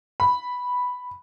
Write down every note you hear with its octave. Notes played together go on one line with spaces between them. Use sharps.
B5